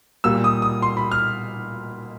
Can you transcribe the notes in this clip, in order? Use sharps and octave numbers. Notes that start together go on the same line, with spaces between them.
A#2 G3 A#3 E6
D#6
D#6
C6
B5
F6